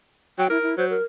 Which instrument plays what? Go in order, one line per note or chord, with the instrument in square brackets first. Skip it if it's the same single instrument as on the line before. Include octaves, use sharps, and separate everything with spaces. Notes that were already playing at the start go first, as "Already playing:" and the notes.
[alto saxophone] F#3 [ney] G5
[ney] E4 [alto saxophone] A#4
[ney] E4
[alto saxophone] F#3 [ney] C5
[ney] A#4